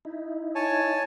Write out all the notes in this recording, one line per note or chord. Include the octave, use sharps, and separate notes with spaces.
D#4 E4
C#5 G#5 A5